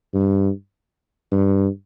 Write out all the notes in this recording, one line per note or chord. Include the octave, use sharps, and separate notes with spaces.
G2
G2